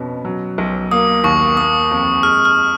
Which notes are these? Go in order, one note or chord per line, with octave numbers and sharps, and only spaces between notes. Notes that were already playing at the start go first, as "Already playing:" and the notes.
Already playing: F2 B2 C#4
F#3
B1
A#3 D#6
D#2 C#6
A#3 D#6
F2
G#3 F6
F6